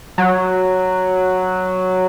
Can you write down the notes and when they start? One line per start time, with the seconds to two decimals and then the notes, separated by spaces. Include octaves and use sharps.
0.18 F#3